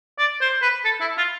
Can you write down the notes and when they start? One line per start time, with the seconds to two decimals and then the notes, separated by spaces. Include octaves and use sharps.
0.18 D5
0.41 C5
0.62 B4
0.84 A4
1.01 E4
1.18 F4